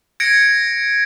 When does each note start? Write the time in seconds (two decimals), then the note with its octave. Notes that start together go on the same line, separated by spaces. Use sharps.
0.20 G#6 A#6 C#7 D7